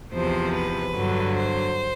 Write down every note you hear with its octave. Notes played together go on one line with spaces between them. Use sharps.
E2 C3 F3 C5
B4
G2 D3 F#3
C5